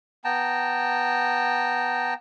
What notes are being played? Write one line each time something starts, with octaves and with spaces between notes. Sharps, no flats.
B3 G5 A5 A#5